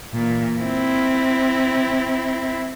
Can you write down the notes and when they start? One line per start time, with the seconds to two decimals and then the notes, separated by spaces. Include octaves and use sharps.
0.14 A#2 E3
0.60 C4 E4